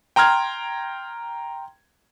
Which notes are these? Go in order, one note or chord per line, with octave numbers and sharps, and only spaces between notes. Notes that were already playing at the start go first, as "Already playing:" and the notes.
G5 A#5 C6 F6 G#6